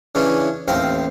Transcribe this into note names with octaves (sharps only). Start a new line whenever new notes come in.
C#3 E3 C#4 D4
A1 D#2 C4 F5